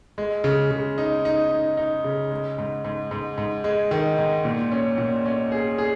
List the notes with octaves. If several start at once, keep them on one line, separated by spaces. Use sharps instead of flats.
G#3
C#3
C#3
D#4
D#4
D#4
D#4
C#3
G#3
G#2
G#2
G#2
G#2
G#3
D#3
G#2
A#2
C#4
A#2
C#4
G#4
G#4